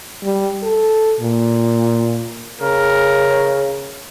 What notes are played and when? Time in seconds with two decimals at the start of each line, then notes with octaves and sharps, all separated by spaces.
0.23 G3
0.63 A4
1.20 A#2
2.61 C#3 A#4